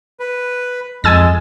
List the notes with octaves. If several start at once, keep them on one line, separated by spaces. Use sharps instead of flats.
B4
F2 G#3 G#5 E6 A6